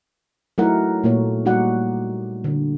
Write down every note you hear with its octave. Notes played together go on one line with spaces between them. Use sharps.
F#3 A3 D#4 E4 A#4 F#5
A#2 A3 A#3 C#5
G3 D#4 F#4 D5 F#5
D3